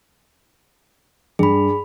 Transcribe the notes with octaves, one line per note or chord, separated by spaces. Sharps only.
G2 G#4 B5